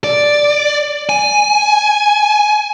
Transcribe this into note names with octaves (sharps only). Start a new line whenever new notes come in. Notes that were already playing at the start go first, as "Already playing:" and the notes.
D5
G#5